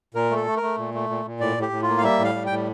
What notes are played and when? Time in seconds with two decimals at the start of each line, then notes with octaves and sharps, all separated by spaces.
0.14 A#2 A#4
0.31 A3
0.36 A4
0.47 A3
0.57 A#4
0.62 A3
0.78 A#2
0.94 A3
1.09 A#2
1.25 A#2
1.40 A2 D5
1.57 A2 G4
1.72 A2
1.83 F4
1.89 A#3
1.98 F5
2.03 G3 E5
2.19 A2
2.24 F5
2.35 G3
2.46 G5
2.50 A2